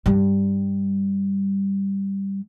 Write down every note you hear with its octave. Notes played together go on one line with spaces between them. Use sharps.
G2 G3